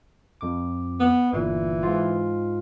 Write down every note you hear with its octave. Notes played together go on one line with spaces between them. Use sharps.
F2 D6
B3
G1 A#2 E3
G#2 F4